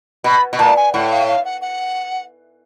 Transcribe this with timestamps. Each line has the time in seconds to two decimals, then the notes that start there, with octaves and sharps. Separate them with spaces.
0.24 B2 B5
0.53 B2
0.59 A#2 A5
0.76 G#5
0.93 A2 F#5
1.10 F5
1.27 F5
1.44 F#5
1.61 F#5